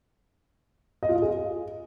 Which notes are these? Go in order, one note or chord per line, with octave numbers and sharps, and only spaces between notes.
D#5
F4
D#5
G#4
D#5